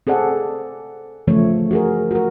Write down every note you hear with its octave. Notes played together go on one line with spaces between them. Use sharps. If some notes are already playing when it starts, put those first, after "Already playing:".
C4 G#4 A4 D5 F#5
C#3 E3 F3 A3 C#5
F#4 G#4 A#4
F#4 A#4